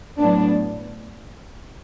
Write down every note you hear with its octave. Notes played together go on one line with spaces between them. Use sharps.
A2 F#3 B3 D4